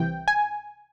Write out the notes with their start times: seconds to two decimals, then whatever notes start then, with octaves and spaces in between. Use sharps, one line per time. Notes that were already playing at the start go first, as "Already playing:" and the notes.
Already playing: C2 C3 E3 G5
0.28 G#5